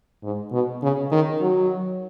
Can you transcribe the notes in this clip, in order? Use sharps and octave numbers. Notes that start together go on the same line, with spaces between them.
G#2
B2
C#3
D#3
F#3